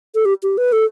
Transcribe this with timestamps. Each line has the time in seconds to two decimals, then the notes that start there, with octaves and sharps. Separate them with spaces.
0.15 A4
0.25 G4
0.43 G4
0.58 B4
0.72 A4